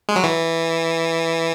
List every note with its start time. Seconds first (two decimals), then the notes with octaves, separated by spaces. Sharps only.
0.09 G#3
0.16 F#3
0.24 E3